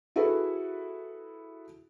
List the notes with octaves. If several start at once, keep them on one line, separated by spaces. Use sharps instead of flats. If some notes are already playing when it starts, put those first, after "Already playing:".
E4 F#4 G#4 A4 B4